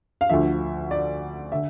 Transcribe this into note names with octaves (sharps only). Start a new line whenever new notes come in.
F5
D2 D3 F3 E5
D5
D3 E5